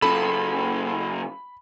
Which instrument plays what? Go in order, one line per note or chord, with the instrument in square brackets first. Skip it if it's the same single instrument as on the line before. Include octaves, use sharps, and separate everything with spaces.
[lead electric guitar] F#2 C#3 [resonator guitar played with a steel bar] F4 A4 [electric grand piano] B5